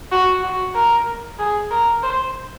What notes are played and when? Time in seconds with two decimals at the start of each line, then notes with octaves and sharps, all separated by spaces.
0.12 F#4
0.43 F#4
0.75 A#4
1.39 G#4
1.71 A#4
2.03 C5